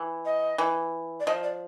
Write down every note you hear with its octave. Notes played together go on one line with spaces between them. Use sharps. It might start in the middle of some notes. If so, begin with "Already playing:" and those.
Already playing: E3
D#5
E3
D5
F3 D#5
D5